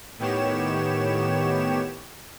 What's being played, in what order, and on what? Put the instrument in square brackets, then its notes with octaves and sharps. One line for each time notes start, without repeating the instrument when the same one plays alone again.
[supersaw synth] A2 D#3 B3 G4 C#5 E7